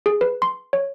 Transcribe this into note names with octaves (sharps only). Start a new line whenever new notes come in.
G#4
B4
C6
C#5